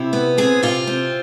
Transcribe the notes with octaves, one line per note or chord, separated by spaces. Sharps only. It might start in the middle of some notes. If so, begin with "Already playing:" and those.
Already playing: C3 E4
B3
C4 G#4
C3 F4
C4